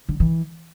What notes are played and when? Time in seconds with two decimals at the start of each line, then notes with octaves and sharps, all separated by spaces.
0.09 D3
0.20 E3